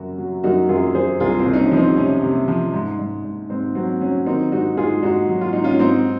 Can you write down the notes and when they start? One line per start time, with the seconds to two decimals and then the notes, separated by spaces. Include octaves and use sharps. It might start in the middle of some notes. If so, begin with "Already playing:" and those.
Already playing: F#2 C#3 F#4
0.18 F#3
0.44 F#2 D#4 F#4
0.69 F#2 F4 G#4
0.95 F#2 G#4 C5
1.20 C2 F4 G#4
1.39 C4
1.46 C2
1.54 D#4
1.59 C#4
1.71 F3
1.77 C4 D#4
1.97 C3 C#4
2.22 C3
2.48 F3
2.74 G#2
2.99 G#2
3.24 G#2
3.49 G#2 C4
3.75 F#3 C4
4.01 F#3 C#4
4.26 D#3 C4 D#4
4.52 G#2 D#4 F#4
4.77 G#2 F4 G#4
5.03 G#2 D#4 F#4
5.29 F#3
5.41 F4
5.53 G#2 D#4
5.64 C#4 F4
5.79 G#2 C4 D#4